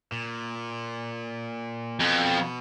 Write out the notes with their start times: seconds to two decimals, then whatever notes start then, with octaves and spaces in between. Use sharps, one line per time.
0.12 A#2
2.00 F2 B2